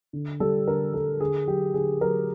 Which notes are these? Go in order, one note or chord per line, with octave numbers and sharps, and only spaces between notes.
D3
G3 A4
D3 A#4
G3 A4
D3 G#4
F#3 G4
D3 G#4
F#3 A#4